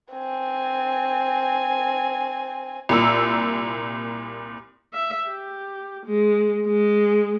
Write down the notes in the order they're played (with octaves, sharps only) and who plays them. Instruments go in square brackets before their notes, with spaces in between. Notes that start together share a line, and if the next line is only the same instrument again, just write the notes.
[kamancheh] C4 G#5
[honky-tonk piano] C2 A#2 E6
[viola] E5
G4
G#3
G#3